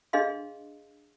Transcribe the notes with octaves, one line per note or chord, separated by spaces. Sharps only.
D4 G#4 D#5 F5 C6